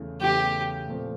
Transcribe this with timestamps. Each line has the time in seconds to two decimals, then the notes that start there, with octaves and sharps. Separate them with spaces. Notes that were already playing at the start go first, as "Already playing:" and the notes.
Already playing: E2 C#3 E3 A3
0.21 E2 C#3 E3 A3 G4
0.88 A#2 F3 A3 C4